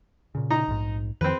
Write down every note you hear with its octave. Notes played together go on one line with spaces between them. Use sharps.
A#2 C#3
D#4 A#5
A#1 G#2
F2 D#3 F3 C4 B4